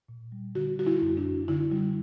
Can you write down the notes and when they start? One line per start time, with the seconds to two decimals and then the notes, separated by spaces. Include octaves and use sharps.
0.09 A#2
0.32 G3
0.55 D3 F#4
0.79 G3 F#4
0.87 E4
1.02 F#2
1.17 D4
1.24 F#2
1.48 D3 E4
1.71 G3